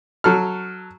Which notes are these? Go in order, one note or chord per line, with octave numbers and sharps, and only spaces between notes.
F#3 A4 F6